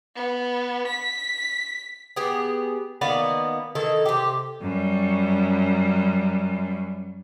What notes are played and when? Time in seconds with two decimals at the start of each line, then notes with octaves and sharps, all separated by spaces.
0.16 B3
0.87 B6
2.16 B3 G4 G#4
3.01 D#3 A#3 B3 D5
3.75 D#3 E3 A4
4.06 C3 G4
4.62 F#2 G3